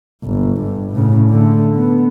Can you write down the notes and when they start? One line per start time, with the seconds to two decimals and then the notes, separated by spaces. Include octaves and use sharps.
0.23 G1
0.61 G2
0.94 A2 C#3
1.29 D3 A3
1.76 B3